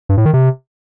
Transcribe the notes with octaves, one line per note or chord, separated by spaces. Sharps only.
G2
A2
D#3
C3